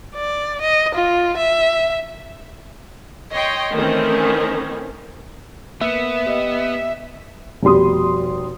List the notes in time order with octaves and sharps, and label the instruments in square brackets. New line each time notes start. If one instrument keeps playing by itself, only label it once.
[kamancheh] D5
D#5
F4
E5
[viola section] C#5 D#5 G5 C6
D#3 E3 A3 C4 C#4
[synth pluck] A#3 [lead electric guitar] B3 [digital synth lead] E5
[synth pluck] G4 D#5
[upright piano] F1 B2 G3 C6 D#6